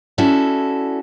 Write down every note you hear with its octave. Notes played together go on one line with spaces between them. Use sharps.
C#4 E4 F#4 A4 D5 E5